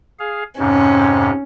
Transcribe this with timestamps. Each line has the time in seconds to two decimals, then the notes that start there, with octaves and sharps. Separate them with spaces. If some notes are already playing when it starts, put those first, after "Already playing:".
0.19 G#4 F5
0.59 F2 G#2 C3 C#4